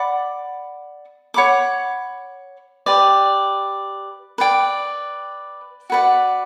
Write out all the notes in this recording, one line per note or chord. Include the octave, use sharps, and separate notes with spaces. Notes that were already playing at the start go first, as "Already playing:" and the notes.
Already playing: D5 F#5 B5 D6
C#5 F#5 B5 D6
G4 B4 D5
B4 D5 G5
F#4 B4 D5 F#5